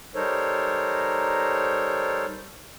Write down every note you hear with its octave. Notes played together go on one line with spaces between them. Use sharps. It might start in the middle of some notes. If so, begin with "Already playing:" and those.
G3 D#4 A4 A#4 C5 C#5